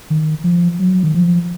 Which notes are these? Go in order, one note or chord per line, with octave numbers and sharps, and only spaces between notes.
D#3
F3
F#3
D#3
F3